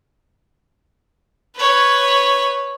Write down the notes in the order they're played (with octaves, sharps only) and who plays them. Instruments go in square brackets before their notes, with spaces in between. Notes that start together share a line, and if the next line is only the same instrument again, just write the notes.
[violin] B4 C#5